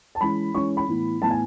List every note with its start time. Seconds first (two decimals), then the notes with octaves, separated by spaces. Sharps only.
0.15 A5
0.21 E3 G#3 C#4 B5
0.54 E3 G#3 C#4 C#6
0.77 B5
0.88 A2 E3 B3
1.22 A2 E3 B3 A5
1.30 G#5